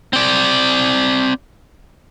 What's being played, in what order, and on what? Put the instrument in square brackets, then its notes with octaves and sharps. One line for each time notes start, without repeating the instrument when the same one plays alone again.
[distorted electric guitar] C4 D5